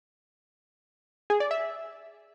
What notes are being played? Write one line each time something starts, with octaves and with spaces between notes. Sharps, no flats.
G#4
D5
E5